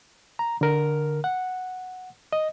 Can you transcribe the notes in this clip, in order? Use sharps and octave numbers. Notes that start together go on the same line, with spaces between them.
A#5
D3 A#4
F#5
D#5